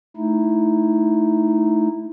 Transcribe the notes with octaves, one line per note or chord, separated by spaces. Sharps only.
A3 D#4 E4